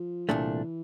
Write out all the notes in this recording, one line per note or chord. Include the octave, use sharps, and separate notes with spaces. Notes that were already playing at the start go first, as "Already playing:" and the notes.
Already playing: F3
C2 A#2 E3 A3 D4